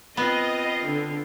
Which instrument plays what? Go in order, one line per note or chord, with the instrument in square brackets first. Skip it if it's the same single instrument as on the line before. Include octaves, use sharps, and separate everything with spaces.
[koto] B3 [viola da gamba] C4 F4 [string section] D#5
[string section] D3